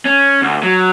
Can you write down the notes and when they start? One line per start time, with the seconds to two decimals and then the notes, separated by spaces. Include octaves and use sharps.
0.05 C#4
0.42 D2
0.63 F#3